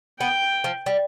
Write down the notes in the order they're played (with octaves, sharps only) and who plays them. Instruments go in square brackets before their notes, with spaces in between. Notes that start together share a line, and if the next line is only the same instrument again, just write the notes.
[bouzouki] B3 [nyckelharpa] G5
[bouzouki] F3
G3